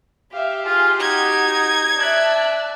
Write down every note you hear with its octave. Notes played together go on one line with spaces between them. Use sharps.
G4 E5 F5
F4 G#4 C6
D#4 F#4 G#6
D5 E5 A5 F#6